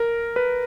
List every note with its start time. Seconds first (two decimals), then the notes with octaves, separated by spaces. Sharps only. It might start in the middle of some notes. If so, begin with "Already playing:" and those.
Already playing: A#4
0.36 B4